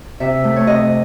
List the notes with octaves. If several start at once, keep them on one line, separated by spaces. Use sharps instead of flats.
C3 E5
A3
C#5
C3 D#5